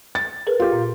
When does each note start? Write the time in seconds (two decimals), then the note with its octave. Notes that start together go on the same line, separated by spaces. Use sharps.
0.15 A6
0.47 G#4 A#4 B4
0.60 F4 G4
0.72 A#2